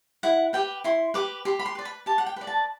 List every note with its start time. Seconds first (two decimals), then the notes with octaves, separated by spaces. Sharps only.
0.23 E4 F#5
0.53 G4 B4 G5
0.84 E4 C6
1.14 G4 B4 D6
1.45 G4 C6
1.59 B5
1.66 C6
1.75 B4 D5
1.85 B5
2.06 G4 A5
2.18 F#5
2.26 G5
2.36 B4 D5
2.47 A5